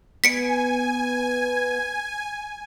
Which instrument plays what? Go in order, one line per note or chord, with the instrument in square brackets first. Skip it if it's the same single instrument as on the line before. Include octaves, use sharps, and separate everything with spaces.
[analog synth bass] B3 [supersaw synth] G#5 [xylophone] B6 C#7 D7